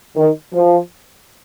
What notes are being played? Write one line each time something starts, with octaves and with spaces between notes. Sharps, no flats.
D#3
F3